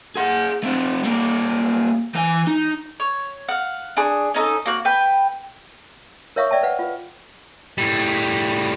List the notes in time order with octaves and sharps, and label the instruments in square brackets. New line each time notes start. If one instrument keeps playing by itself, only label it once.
[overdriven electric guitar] G#4 F#5
A3 C4
G3 A#3
E3 G#5
D#4
[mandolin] C#5
F5 F#5
D4 G#4 C#6
C#4 D#4 A4
A#3 F#4 F#6
B4 G5
[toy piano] A#4 C#5 E5 F5 C#6 D#6
D5 E5 G5 A5
B4 F5 F#5
F4 B4
[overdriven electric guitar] A2 G3